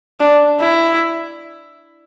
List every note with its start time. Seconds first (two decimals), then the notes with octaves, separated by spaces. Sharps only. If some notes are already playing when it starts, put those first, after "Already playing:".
0.20 D4
0.60 E4